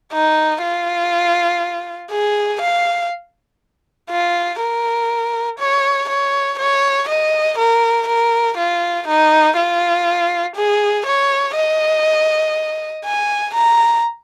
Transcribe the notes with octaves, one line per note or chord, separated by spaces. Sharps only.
D#4
F4
G#4
F5
F4
A#4
C#5
C#5
C#5
D#5
A#4
A#4
F4
D#4
F4
G#4
C#5
D#5
G#5
A#5